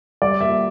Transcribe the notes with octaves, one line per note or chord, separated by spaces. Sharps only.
G3 D5
A#3 E5